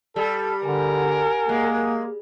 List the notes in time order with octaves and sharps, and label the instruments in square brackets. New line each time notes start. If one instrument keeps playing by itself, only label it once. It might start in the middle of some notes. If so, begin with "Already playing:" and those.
[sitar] G3 [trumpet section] A4
[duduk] D3 [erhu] A#4 [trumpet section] F#5 G#5
[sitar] G#3 [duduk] A#3